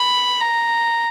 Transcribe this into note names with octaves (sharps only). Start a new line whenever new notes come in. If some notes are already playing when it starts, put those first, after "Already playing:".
Already playing: B5
A#5